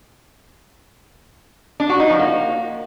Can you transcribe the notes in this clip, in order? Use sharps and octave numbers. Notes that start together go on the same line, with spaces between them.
D4
F#4
D#4
F3
A#3